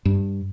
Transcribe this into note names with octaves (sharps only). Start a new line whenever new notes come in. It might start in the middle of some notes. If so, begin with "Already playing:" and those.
G2